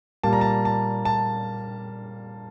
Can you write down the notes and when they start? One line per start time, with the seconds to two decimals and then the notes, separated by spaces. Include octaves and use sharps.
0.23 A#2 G3 A#3 A5
0.33 A#5
0.41 A5
0.65 A5
1.05 A5